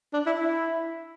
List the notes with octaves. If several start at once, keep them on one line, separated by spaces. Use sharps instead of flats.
D4
E4
E4